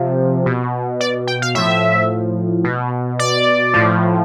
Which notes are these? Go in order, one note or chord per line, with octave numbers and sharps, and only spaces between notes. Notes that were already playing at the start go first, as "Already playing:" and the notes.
Already playing: C3 F3
B2
D5
G5
F5
A2 F3 E5
B2
D5
A2 F3